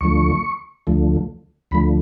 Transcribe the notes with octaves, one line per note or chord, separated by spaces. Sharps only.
D2 D3 F3 A3 C#6
D2 D3 F3 A3
D2 D3 F3 A3 B5